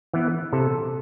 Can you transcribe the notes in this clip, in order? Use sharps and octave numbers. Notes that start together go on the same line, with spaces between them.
E3 B3
C3 A4